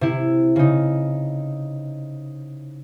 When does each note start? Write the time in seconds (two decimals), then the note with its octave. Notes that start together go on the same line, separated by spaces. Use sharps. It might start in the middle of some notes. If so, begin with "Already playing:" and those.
0.01 C3 E4
0.56 C#3 D#4